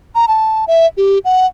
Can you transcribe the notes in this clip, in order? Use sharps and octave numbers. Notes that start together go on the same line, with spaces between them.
A#5
A5
E5
G4
F#5